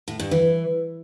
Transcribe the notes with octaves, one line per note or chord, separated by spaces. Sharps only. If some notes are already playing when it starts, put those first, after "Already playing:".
A2
G2
E3